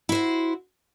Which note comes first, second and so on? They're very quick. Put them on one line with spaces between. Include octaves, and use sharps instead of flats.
E4 C5 F#4